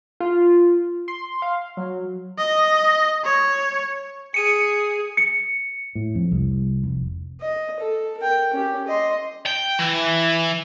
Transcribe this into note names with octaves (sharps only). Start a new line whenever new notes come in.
F4
C6
F5
F#3
D#5
C#5
G#4 C#7 D#7
C#7
A2
F2
C2
F1
D#5
A4
A#4 G5
C#4 G4
D#5 C6
G5
E3